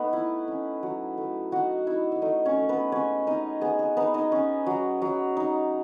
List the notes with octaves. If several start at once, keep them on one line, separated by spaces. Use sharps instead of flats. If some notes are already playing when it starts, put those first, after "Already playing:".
Already playing: A3 B3 D#4 B4
E4
C#4
F#3
A3
D#4 F#4 F#5
D#4 E4 E5
E5
A3 D#4 D#5
C#4 C#5
A3
B3 B4
G#3 C#4 C#5
C#4 D#4 D#5
B3 G#4
G#4
B3 D#4 B4
D#4 D#5
C#4
F#3
F#3
D#4